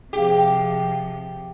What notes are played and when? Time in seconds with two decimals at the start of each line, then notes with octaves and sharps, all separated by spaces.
0.13 C3 F3 G4 G#4 F5